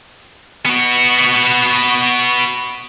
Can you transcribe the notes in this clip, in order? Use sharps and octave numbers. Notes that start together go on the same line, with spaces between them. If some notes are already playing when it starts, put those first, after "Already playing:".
B3 F#4